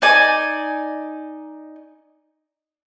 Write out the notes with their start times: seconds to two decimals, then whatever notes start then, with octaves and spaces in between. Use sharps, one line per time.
0.02 D#4 D5 G#5